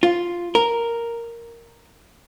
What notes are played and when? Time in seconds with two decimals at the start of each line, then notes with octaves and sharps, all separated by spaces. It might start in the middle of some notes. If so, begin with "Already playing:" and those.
0.03 F4
0.55 A#4